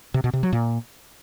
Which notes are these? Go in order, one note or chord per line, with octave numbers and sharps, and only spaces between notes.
C3
B2
C3
F#3
A#2